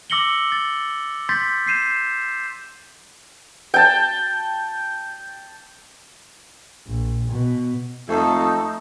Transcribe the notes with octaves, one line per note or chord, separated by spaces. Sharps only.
D6 E6 A#6 C#7 F#7 G7
A6
C6 G6 A6 B6
G6 C7 D#7 E7
G5 A5
A#1
B2
F2 A3 D#4 A4